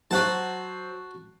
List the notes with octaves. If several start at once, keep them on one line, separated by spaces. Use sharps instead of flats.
F#3 F#4 C5 F#5 A5